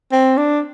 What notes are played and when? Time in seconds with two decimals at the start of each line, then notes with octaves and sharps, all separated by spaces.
0.12 C4
0.38 D4